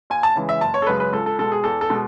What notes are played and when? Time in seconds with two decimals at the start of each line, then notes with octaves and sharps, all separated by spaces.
0.10 D#2 G#5
0.23 A5
0.35 C#3 E3 G#3
0.49 E5
0.61 F#1 A5
0.74 C#5
0.82 A4
0.87 F#2 C#3 G#3 B4
1.00 B4
1.13 C#2 A4
1.26 A4
1.39 B2 G#3 A4
1.52 G#4
1.64 E2 A4
1.81 A4
1.90 B2 G#3